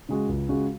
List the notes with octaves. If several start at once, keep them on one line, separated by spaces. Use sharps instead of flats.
C#3 G#3 F#4
C#2
C#3 G#3 F#4